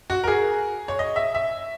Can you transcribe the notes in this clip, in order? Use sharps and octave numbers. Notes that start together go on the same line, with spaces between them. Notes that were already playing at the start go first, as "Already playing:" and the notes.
F#4
A#4
G#4
C#5
D#5
E5
E5